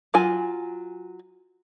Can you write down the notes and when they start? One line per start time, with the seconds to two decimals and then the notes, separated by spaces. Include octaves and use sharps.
0.14 F#3 F4 G#5